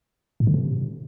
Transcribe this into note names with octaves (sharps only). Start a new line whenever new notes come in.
A2
D3
C3